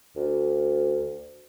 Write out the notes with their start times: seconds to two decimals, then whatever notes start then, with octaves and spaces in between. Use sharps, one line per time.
0.16 D2